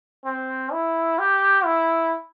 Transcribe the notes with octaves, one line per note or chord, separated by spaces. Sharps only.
C4
E4
G4
E4